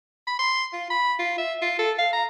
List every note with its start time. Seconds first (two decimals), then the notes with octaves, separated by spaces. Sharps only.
0.27 B5
0.39 C6
0.73 F4
0.90 B5
1.19 F4
1.38 E5
1.62 F4
1.79 A4
1.99 F5
2.13 A#5